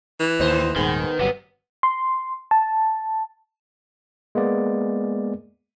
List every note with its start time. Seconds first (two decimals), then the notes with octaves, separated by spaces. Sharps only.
0.20 E3
0.40 D#2 A2 C5 D#5
0.76 D#1 G#2 D#3 B3 G#4
1.19 G1 C3 F#3 G3 B3
1.83 C6
2.51 A5
4.35 G#3 A#3 B3 D5